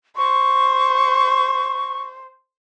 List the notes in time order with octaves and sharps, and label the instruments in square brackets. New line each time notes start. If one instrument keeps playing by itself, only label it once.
[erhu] C5 [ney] C#6